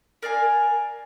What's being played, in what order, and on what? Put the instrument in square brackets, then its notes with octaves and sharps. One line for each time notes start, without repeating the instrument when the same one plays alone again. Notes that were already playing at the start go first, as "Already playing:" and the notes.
[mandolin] A#4 D5 F5 G#5